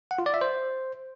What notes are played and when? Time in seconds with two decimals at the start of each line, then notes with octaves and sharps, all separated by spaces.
0.11 F#5
0.19 F4
0.26 D5
0.34 E5
0.41 C5